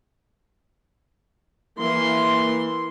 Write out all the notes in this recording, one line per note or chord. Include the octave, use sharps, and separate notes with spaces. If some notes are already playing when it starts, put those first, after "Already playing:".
E3 A#3 C6